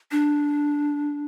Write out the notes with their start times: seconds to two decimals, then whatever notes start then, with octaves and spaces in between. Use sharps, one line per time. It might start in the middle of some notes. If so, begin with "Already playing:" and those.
0.11 D4